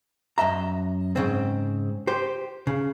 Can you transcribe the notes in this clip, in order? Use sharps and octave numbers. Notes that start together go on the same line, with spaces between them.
F#2 D#5 E5 A#5
G#2 C#3 C4
G4 C5
C#3